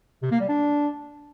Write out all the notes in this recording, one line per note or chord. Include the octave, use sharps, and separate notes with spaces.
C3
A#3
G3
D4